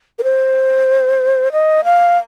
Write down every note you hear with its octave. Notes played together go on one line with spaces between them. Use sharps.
A#4
C5
D#5
F5